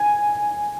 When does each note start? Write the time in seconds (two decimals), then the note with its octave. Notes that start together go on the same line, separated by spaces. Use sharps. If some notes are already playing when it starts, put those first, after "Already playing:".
Already playing: G#5